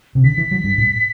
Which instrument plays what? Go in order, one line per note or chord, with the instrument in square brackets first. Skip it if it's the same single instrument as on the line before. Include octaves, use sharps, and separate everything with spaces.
[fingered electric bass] C3
[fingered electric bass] D3 [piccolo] B6
[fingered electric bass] E3
F#3
G2
A2